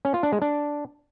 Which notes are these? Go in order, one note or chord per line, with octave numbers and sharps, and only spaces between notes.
C#4
F4
D4
G#3
D4